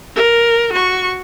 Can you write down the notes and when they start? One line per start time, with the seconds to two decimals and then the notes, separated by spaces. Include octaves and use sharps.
0.16 A#4
0.72 F#4 C#6